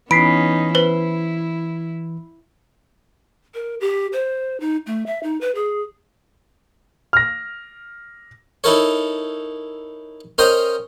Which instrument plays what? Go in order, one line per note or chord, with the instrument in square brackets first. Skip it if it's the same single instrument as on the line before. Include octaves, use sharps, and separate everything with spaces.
[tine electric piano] E3 [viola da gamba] B3 C#4 D#4 [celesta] B5 B6 C7 [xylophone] D7
[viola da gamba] E4 [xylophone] B4 C5
[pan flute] A#4
G4
C5
D#4
A3
E5
D#4
B4
G#4
[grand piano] F6 A#6
[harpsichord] D#4 E4 A4 A#4 C#5
C#4 A#4 C5 D#5 G5